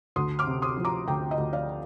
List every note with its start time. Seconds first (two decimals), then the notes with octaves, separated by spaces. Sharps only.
0.16 D2 C6 D#6
0.39 D6 F6
0.47 C3
0.62 C6 D#6
0.77 F3
0.85 A#5 D6
1.07 D2 G5 A#5
1.31 D#5
1.38 D2
1.53 D5 F5